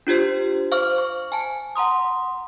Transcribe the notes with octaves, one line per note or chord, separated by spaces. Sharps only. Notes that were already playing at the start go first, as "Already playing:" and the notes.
D4 F4 G4 C5
C5 F5 C#6 D6 F6
C#6
G#5 A5
F#5 A#5 C6 D#6